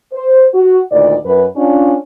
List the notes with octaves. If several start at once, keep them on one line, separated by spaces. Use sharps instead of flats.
C5
F#4
D2 A#2 D#3 D5
F#2 B4
C#4 D4 F4